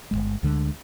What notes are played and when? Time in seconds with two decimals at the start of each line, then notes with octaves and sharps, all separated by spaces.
0.11 G1 D#2 G#3
0.43 D2 D3 G#3